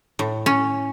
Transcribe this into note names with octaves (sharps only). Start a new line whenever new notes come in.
A2
C#4